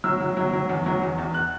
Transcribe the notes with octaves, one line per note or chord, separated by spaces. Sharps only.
F#3 E6
F#3
F#3
F#3
E2
F#3
E2
E2
F#6